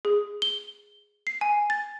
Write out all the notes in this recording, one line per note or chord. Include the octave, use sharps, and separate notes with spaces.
G#4
G7
C7
G#5
A6